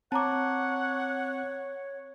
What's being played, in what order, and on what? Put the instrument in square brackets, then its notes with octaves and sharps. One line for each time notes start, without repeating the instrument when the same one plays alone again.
[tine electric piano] C4 [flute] C#5 [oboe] F#5 [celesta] A5 A#5 D6